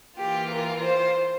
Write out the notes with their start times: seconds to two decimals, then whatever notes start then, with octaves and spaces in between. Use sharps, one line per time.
0.18 E3 A#3 F4 G4
0.51 A#4
0.83 C5